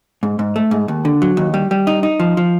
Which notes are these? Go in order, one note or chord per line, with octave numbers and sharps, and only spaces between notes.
G#2
G#2
A3
G#2
D#2
D3
F#3
D#2
G3
G3
D#4
D#4
F3
F3